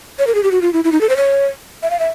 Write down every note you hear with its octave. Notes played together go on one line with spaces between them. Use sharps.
C#5
A#4
G#4
G4
F#4
F4
E4
E4
D#4
A4
C5
C#5
E5
F5
E5